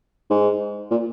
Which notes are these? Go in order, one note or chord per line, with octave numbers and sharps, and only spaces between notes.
G#2
A#2